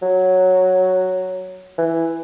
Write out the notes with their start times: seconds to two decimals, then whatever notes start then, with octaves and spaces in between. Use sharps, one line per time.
0.02 F#3
1.78 E3